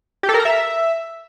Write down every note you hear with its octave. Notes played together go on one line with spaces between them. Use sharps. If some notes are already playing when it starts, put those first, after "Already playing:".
G4
A4
A#4
A#5
E5